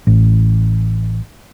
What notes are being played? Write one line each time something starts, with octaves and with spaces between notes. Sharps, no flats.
A1